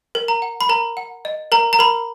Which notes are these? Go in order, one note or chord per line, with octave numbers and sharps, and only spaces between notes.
A#4
A#5
F#5
B5
A#4 A#5
F#5
D#5
A#4 A#5
A#5
A#4 B5